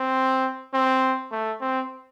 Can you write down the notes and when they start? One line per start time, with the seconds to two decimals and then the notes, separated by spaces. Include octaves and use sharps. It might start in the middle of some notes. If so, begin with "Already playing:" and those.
Already playing: C4
0.74 C4
1.32 A3
1.61 C4